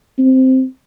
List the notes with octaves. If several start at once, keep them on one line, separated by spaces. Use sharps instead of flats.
C4